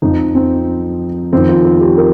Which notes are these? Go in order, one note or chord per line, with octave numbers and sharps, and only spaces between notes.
F2 F3 D#4
C4
F2 D#3 C4
F4
F4
G4
A#4